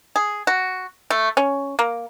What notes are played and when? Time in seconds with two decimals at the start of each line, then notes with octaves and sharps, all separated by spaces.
0.16 G#4
0.47 F#4
1.10 A3
1.37 C#4
1.79 A#3